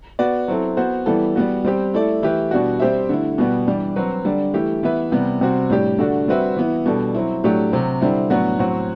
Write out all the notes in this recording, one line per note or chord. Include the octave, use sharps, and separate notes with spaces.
B3 F#4 B4 D5
F#3 C4 E4 A4
B3 F#4 C5
E3 G3 B3 E4 A4
G3 B3 F#4
G3 C4 G4
A3 E4 A4 D5
E3 A3 E4 G4 B4
B2 G3 D4 F#4
G3 C4 G4 C5 E5
D3 A3 E4
B2 G3 B3
E3 G3 D4
F#3 C4 F#4 B4
D3 G3 D4
E3 A3 E4 G4
E3 B3 E4 B4 E5
C3 G3 B3
C3 G3 C4 F#4
A2 G3 D4 G4
D3 A3 D4 F#4
G3 C4 F#4 B4 E5
E3 B3 E4
B2 G3 D4 A4
F#3 C4 E4
A2 F#3 A3 D4 G4
C3 F#3 C4
D3 G3 C4 E4
A2 F#3 B3 D4 F#4
A2 F#3 C4 F#4